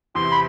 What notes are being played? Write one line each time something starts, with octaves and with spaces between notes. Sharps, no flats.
E2 C3 E3 C6
B5